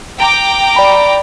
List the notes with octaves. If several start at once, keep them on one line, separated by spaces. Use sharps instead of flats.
G5 A#5 D6
D5 B5